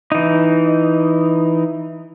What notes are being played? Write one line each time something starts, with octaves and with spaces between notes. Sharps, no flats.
E3 D#4